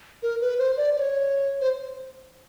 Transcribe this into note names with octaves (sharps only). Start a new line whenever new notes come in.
A#4
B4
C5
D5
D5
C#5
C5